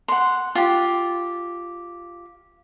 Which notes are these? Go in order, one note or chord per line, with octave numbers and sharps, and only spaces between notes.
F#5 C6
F4 G4